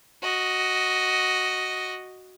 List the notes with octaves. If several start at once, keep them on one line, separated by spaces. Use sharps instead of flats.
F#4 D#5